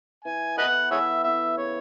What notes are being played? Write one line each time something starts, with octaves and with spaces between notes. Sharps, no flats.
E3 G#5
B3 E4 A4 B4 D#5 F#5
E3 G#4 C#5 E5
B3 E4 A4 E5
C#3 C#5